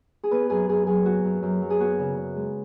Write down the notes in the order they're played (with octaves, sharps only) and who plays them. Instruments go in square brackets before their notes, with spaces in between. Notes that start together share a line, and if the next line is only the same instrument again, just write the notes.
[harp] G#4
B3 B4
F#2 G#4
F#2 G#4
F#3 G#4
B3 F#4
F#2
F#2
F#3
G#4
B3 F#4
C#3
C#3
G#3